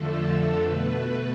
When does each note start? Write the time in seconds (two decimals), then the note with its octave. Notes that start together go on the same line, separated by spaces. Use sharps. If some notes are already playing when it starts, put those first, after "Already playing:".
Already playing: F2 D3 F3 A3 A4
0.20 A4
0.62 B2 A3 B4